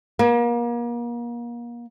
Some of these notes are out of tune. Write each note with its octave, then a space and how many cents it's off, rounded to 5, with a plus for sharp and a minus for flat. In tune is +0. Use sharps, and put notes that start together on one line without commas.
A#3 +35